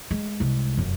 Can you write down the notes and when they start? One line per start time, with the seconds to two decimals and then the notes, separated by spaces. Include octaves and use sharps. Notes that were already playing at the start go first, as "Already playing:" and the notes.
0.11 G#3
0.40 C2 G#3
0.77 F1 F#2